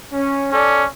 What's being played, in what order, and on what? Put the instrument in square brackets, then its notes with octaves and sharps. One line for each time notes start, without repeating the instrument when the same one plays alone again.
[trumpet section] C#4
[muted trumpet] C#4 [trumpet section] A4 D5